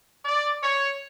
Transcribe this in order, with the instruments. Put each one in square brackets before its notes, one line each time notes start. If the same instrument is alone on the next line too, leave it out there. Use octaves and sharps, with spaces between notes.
[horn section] D5
C#5